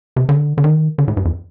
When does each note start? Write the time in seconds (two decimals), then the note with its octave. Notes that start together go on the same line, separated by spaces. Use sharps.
0.16 C3
0.29 D3
0.58 D3
0.64 D#3
0.98 D3
1.08 A2
1.17 G2
1.25 F2